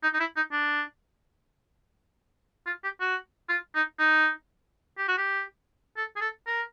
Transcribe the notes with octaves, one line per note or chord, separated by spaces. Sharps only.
D#4
D#4
E4
D#4
D4
F4
G4
F#4
F4
D#4
D#4
G4
F#4
G4
A4
G#4
A4
A#4